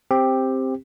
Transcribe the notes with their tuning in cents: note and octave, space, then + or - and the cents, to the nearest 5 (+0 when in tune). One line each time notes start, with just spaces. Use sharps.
C4 +5 G4 +10